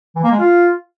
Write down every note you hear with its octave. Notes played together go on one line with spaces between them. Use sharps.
E3
A#3
G#3
F4